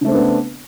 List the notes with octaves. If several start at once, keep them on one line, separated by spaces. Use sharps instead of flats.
C#3 A3 B3 C4 D4